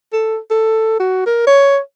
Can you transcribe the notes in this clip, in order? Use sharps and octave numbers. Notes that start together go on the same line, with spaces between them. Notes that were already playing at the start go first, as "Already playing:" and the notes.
A4
A4
F#4
A#4
C#5